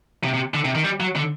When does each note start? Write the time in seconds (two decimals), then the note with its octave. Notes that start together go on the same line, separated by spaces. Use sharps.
0.24 C3
0.34 C3
0.54 D3
0.65 C3
0.75 D#3
0.84 G3
1.00 F#3
1.16 D3